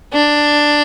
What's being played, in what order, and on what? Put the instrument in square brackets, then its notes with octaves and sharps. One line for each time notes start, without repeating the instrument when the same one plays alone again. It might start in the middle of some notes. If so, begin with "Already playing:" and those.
[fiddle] D4